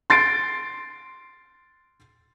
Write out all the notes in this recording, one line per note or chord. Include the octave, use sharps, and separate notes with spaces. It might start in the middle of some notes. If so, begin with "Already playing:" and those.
C6 A6 C7 D7